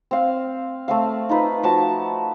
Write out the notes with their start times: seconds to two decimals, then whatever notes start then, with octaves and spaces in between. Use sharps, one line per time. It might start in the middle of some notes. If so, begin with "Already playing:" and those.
0.11 C4 F5
0.88 A3 C4 F5
1.29 D#4 F4 B4
1.63 F3 F#4 A5